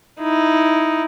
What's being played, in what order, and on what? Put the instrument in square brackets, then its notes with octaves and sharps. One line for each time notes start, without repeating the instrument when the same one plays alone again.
[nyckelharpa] D#4 E4